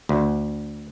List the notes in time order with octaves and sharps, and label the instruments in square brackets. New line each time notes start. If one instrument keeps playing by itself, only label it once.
[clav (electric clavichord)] D2